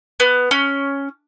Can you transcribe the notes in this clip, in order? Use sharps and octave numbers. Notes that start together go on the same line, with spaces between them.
B3
C#4